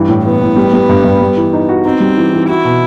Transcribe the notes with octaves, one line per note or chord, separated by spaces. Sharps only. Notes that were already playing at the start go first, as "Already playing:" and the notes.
Already playing: G2 E3
A2
E3 B3
A2
G3
G3
G2
G2
G3
E3
D#4
F#4
C4 D#4
G3
E3
E3
E4 F#4
B2